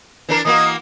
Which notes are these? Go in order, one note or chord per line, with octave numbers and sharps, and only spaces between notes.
E3 D4 A#4
E3 A#3 F#4 D#5